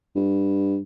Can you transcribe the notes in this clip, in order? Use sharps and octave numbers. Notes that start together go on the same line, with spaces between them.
G2